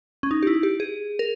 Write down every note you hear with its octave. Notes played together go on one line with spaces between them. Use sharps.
C#4
D#4
G4
E4
G4
G#4
A#4